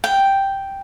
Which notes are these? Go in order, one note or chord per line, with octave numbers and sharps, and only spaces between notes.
G5